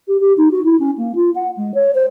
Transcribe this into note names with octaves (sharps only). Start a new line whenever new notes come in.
G4
G4
D#4
F#4
E4
C#4
A#3
F4
F#5
G#3
C#5
C5